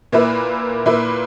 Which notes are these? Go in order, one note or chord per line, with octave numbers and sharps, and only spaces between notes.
A#2 A#3 E4 B4
A#2 A#3 E4 B4